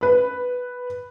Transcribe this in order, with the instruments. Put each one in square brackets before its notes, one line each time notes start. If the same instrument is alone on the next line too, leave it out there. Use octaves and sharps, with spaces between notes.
[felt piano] B4 B5